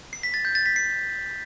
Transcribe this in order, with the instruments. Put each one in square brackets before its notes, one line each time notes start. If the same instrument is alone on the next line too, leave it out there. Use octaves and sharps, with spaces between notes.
[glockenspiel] C7
B6
A6
G6
A6
B6
C7